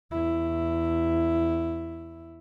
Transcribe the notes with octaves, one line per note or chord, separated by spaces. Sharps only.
E2 E4